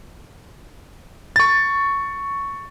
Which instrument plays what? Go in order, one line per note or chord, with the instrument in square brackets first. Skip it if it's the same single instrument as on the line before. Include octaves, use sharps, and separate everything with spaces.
[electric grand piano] C#6 A6